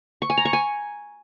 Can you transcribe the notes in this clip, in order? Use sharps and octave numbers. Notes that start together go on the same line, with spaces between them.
C#6
G#5
A#5
C#6
G#5